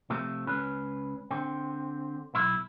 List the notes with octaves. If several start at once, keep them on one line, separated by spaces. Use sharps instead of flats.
C3 F3 A3
C#2 C#4 B4
D3 C4
B1 E4